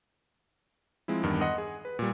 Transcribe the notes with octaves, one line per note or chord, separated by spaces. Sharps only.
F3 G#3 C4 E4
E2 G2 D#3
D#5 F#5 C6 D#6
G#4
B4
A#2 G3